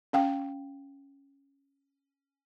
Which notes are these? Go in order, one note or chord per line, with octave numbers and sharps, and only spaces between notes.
C#4 F5 G5